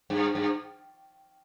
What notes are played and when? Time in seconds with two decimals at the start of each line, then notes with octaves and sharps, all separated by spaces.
0.10 G2
0.35 G2